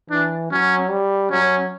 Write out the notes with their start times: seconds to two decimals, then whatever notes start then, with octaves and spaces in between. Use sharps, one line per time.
0.10 E3 D4
0.51 F#3 C#4
0.91 G3
1.31 F#3 C#4